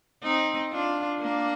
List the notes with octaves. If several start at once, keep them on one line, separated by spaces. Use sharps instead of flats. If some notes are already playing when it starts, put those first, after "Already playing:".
C4 D#4
D4 F4
A#3 D4